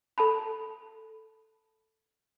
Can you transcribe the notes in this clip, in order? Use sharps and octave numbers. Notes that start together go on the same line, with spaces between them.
A4 A5 B5